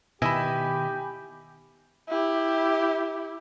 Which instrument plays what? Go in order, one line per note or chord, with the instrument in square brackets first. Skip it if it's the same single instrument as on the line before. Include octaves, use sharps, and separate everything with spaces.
[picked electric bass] B2 D#3 [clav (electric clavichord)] E4 D#5 E5 [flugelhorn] G4 [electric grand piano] G#5 B5
[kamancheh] E4 G4